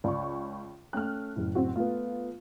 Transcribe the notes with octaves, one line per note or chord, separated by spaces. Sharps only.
C#2 D5 C#6
A3 C#4 G5 F6 F#6
F#1 A2
C4 F#4
A3 B3 F4